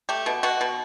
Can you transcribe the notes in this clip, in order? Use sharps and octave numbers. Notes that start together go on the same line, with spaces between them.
A3 G4
B2
B2 F#4
B2